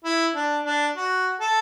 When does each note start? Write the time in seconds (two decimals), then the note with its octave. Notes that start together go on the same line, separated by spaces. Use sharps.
0.05 E4
0.35 D4
0.65 D4
0.96 F#4
1.41 A4